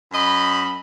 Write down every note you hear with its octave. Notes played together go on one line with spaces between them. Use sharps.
F#2 D#5 B5